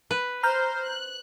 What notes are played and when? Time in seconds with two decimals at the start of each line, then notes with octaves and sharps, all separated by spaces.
0.11 B4
0.43 C5 A#5 F6 G6
0.86 F#6